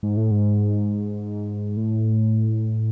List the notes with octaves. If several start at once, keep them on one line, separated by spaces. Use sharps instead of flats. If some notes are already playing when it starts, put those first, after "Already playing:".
G#2
A2
G#2
A2